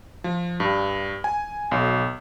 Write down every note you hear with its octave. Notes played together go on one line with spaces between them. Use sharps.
F3
G2
G#5
B1